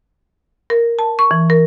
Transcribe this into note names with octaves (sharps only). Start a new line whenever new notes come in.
A#4
A5
C#6
E3
A#4